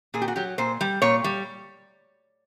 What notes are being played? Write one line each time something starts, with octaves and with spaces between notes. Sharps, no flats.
A#2 G#4
G4
F#4
F#3 G4
A#2 C5
G3
A#2 C#5
G3